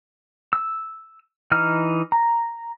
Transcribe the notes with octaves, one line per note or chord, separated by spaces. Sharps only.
E6
E3 D#4 F6
A#5